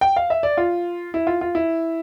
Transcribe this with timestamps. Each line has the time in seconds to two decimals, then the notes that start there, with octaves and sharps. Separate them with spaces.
0.01 G5
0.17 F5
0.30 E5
0.43 D5
0.57 F4
1.14 E4
1.27 F4
1.41 F4
1.55 E4